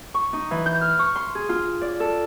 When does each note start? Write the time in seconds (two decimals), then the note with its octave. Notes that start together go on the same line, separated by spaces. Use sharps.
0.14 C#6
0.33 D#4
0.51 E3
0.66 G6
0.81 F6
0.99 C#6
1.16 C6
1.35 G#4
1.49 F4
1.81 D5
2.00 A4